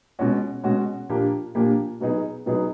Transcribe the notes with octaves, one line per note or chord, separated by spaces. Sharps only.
B2 G#3 C#4 F#4
B2 G#3 C#4 F#4
A#2 F3 A#3 D4 G4
A#2 F3 A#3 D4 G4
B2 F#3 B3 D#4 G#4
B2 F#3 B3 D#4 G#4